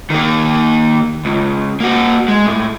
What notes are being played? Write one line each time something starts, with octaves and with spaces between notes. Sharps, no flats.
D#3 A#3
C#2
A#3 F#4
G#3
A2